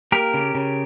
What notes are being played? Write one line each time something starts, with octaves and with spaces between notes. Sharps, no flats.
A#3 G4 A#4
C#3
C#3